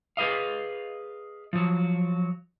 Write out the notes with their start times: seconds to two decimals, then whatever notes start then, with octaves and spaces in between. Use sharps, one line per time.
0.17 G#4 B4 D#5 F5
1.53 F3 F#3